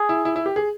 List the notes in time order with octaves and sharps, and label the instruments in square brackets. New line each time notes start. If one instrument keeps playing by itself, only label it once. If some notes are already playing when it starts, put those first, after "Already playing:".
Already playing: [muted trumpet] G#4
[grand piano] E4
E4
E4
G4
G#4